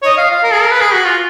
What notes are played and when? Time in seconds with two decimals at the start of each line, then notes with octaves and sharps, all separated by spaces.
0.02 C#5
0.05 D#5
0.18 F5
0.31 F5
0.43 A#4
0.52 G#4
0.61 A#4
0.71 B4
0.80 G#4
0.93 F#4
1.05 F4